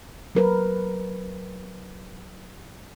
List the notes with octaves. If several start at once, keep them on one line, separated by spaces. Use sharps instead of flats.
F#3 A#4 B4